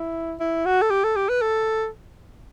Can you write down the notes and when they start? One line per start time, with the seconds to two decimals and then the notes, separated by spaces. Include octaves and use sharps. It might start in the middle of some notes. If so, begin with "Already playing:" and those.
Already playing: E4
0.40 E4
0.66 F#4
0.82 A4
0.90 G4
1.04 A4
1.16 G4
1.29 B4
1.41 A4